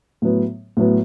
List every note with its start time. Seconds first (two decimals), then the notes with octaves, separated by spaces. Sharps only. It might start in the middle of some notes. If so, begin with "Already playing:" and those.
0.22 A2 F#3 B3
0.77 A2 F#3 B3